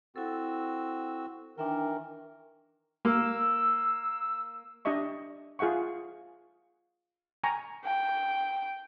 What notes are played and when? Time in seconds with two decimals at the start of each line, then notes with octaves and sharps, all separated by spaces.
0.16 C4 E4 F#4 A4 E6
1.58 D#3 E3 D4 A#4 E5 G5
3.05 A#3 E6
4.85 D4 G4 D#5 E5 C#6
5.59 F4 G#4 E5 F#5 C#6
7.43 G5 G#5 A#5 C#6
7.85 G5